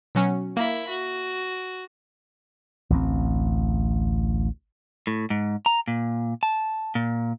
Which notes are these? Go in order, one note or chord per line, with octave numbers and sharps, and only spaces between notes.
B2 F#3 C#4
A#3 E4 B5
F#4
A1 D2 G#3 C4
A2
G#2
A#5
A#2
A5
A#2